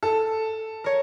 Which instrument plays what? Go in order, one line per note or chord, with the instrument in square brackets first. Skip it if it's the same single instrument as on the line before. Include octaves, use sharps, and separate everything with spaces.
[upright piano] A4
[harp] A#4 C#5